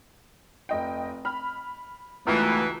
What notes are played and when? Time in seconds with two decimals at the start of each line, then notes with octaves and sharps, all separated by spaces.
0.69 F1 D#5 G5
1.25 B5 F6
2.27 C#2 B2 D#3 E3 A3 A#5 F6